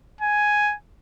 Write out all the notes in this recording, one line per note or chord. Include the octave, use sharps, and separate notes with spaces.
G#5